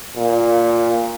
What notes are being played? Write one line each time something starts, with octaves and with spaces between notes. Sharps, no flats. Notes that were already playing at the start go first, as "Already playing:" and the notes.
A#2